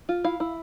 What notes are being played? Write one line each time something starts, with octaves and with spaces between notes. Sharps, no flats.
F4
E4 F5
E4